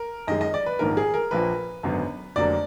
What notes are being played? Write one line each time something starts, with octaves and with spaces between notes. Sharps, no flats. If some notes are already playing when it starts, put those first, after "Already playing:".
Already playing: A#4
F#2 D#3 G#3 D#5
D#5
D5
B4
A#1 G#2 D#3 A#3 A#4
G#4
A#4
A#1 A#2 F3 A#3 B4
G#1 F#2 D3 F#3 B3
F1 F2 D3 F#3 A#3 D5